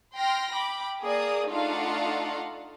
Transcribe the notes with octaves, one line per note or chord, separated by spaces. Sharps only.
G5 C6 F6 A#6
G5 B5 D6
A#3 G#4 D5 D#6
A3 D4 D#4 F4 F5 F#5